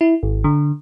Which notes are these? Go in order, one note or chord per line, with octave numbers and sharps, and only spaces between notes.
E4
G#1
D3